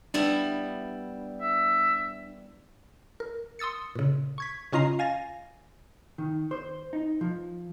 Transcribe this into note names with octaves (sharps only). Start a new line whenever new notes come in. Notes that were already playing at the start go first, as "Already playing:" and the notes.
G3 B3 D4 E4
E5
A#4
C6 D#6 E6 A6 C#7
A#2 C#3
C#6 G#6 B6
C#3 C#4 F4 D#5 A#5 C7
F5 G#5 A6 A#6
D#3
C5
D#4
F3